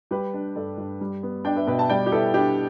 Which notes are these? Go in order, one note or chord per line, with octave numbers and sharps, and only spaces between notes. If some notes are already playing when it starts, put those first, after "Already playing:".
G3 G4 B4
D4
G2 A4 D5
G2
G3
B3
D4 D5 G5
B4 E5
B2 B4 E5
E5 A5
G3 D5 G5
G4
B3 E4 A4
D4 G4